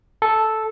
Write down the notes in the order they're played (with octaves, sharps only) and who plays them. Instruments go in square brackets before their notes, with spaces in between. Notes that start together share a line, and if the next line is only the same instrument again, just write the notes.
[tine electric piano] A4